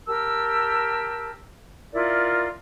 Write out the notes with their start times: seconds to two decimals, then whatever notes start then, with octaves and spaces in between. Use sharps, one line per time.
0.06 G4 A#4 A5 E6
1.93 E4 F4 A#4 D5